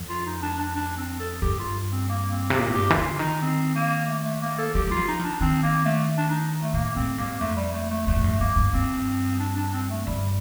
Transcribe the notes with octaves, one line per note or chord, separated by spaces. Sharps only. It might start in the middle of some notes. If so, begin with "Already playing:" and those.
Already playing: F2
F4
D#4
D4
D4
D4
C4
A4
G2 G4
F4
C4
A#3
C4
C3 G4
A#2
A2
G2 G4
D#3
D3 F4
D#3 D#4
C4
A#3
A3
A3
A#3
A4
G3 G4
G3 F4
F3
D#4
D#3 D4
D#3 C4
A#3
A3
D4
D#4
A3
A2 A#3
A2 C4
G2 A#3
F2 A3
G3
A3
A3
F2 A3
A2
G2
G2 A#3
G2
G2 C4
D4
D4
C4
A3
G2 G3